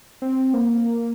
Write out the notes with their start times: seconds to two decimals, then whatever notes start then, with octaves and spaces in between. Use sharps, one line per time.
0.22 C4
0.54 A#3